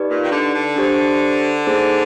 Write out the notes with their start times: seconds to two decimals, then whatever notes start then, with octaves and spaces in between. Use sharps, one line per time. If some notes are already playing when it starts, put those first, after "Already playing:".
Already playing: D#4 G4 B4 D5
0.09 A#2
0.23 D#3
0.31 D3
0.54 D3
0.76 D4 G4 C5
1.67 A#3 D#4 G#4 C5